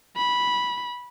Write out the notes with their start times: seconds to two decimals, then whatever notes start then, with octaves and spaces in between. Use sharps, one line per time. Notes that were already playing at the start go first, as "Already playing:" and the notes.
0.17 B5